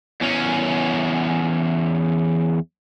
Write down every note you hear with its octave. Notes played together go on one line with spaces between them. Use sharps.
E2 C#4